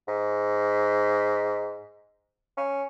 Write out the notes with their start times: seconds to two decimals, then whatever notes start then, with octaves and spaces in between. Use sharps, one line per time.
0.08 G#2
2.57 C#4